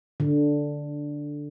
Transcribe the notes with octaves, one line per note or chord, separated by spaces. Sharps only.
D3